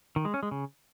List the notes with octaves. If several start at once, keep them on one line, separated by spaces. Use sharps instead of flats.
D#3
G#3
C#4
G#3
C#3